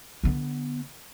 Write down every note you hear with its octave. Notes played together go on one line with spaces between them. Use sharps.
D3 B3